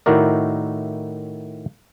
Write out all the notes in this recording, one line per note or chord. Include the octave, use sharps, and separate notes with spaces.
A2 D#3 E4 F#4 A#4 D5